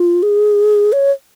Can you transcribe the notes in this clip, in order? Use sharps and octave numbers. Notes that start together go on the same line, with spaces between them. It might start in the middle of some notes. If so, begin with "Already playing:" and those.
Already playing: F4
G#4
C#5